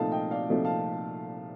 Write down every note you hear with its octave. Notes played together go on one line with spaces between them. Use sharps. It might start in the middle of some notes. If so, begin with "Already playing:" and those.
Already playing: C2 A#2 F3 A3 D#4 F5 A5
D#5 G5
D5 F5
C2 A#2 F3 A3 D#4
F5 A5